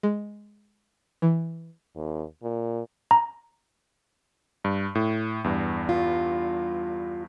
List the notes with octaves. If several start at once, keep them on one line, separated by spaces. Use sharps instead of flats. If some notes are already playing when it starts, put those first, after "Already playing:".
G#3
E3
D#2
A#2
A#5
G2
A2
E2 G2
F4